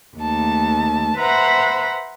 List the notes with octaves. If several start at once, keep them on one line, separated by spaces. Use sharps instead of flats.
D#2 A3 A5
B4 C5 E5 F#5 A#5 B5